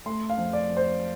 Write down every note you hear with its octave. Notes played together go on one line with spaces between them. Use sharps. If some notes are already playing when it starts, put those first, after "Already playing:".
A3 C6
F5
F2
D5
F2
C5